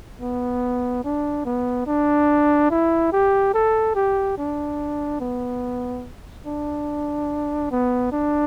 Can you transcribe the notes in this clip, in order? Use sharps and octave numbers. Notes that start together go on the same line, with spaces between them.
B3
D4
B3
D4
E4
G4
A4
G4
D4
B3
D4
B3
D4